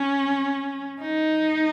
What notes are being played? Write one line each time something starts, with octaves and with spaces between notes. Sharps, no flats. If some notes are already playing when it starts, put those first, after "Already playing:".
Already playing: C#4
D#4